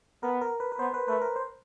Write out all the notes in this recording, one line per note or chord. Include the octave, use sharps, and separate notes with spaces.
B3 A#4
A#4
B4
B4
B3 C5
B4
A3 B4
A#4
C5